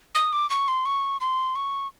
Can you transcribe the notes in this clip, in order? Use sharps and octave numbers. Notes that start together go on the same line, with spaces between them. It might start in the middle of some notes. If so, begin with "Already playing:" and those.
D#6
D6
C#6
C6
C#6
C6
C#6